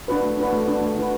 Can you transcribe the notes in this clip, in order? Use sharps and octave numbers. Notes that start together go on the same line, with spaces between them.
D4 F#4 B4
A3
D4 F#4 B4
A3
D4 F#4 B4
A3
D4 F#4 B4